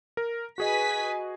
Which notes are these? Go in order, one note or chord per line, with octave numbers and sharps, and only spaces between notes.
A#4
F#4 G#4 B4 D#5 G#5 B6